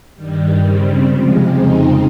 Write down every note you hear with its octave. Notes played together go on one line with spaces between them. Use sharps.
G2 D#3 G3
C#3 G3 C4
C3 F3 G#3
F2 C#3 G#3 C4 D#4